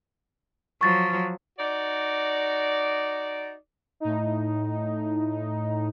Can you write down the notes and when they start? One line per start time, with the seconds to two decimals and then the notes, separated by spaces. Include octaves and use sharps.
0.81 F3 F#3 C#6 A6
1.59 D#4 F#4 D5
4.00 A2 D#4